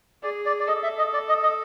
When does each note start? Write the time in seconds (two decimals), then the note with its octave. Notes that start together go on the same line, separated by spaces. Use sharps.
0.23 G#4 D5
0.46 D5
0.60 D5
0.68 A4 D#5
0.83 E5
0.98 D#5
1.14 D5
1.29 D#5
1.43 D#5